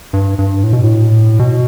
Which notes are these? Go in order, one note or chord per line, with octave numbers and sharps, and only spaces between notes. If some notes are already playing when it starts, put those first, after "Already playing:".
G2
G2
A2
B2
A2
B2